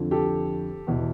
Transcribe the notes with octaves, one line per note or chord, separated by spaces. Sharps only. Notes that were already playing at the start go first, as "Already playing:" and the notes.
Already playing: F2 D3 F3
G4 A4
E2 B2